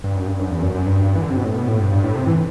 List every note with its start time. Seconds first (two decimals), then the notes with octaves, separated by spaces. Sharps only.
0.04 G2
0.15 F#2
0.27 G2
0.39 F#2
0.51 E2
0.62 F#2
0.75 F#2
0.86 G2
1.16 E3
1.22 D3
1.30 C3
1.37 B2
1.44 A2
1.56 B2
1.68 A2
1.80 G2
1.91 G2
2.04 A2
2.16 C3
2.27 E3